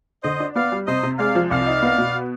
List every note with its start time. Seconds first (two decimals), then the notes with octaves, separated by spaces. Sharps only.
0.24 D3 C5 D#5
0.40 D4
0.55 B3 D5 F5
0.72 G3
0.87 C3 C5 D#5
1.03 C3
1.19 G#3 D5 F5
1.35 F3
1.50 C2 D5 F5
1.66 D#4
1.82 B3
1.98 B2